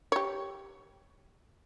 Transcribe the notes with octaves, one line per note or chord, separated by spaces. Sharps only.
G4 C#5